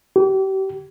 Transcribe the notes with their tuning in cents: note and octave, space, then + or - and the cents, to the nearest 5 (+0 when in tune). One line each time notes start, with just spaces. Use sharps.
G4 -35